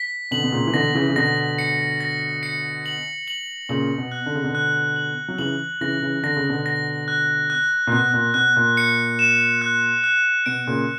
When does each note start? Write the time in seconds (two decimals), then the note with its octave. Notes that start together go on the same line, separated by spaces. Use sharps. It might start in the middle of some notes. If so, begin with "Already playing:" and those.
Already playing: B6
0.31 B2 D3 F#7
0.44 B2
0.52 A#2 C#3
0.67 E3
0.73 B2 D3 A#6
0.95 C#3 E3
1.09 C#3
1.16 B2 D3 A#6
1.59 C#7
2.01 A#6
2.43 C#7
2.86 F#7
3.28 F#7
3.69 A#2 C#3 F#7
3.98 B2
4.12 F#6
4.26 D3
4.35 C#3
4.44 B2 D3
4.55 F#6
4.96 F#7
5.28 F#3
5.38 C#3 E3 F#7
5.81 C#3 E3 A#6
6.02 C#3 E3
6.23 D3 A#6
6.36 C#3
6.49 B2 D3
6.66 A#6
7.08 F#6
7.50 F#6
7.87 A#2
7.92 B2 F#6
8.14 A#2
8.34 B2 F#6
8.56 A#2
8.77 C#7
9.19 E7
9.62 F#6
10.04 F#6
10.46 B2 D7
10.67 A#2 C#3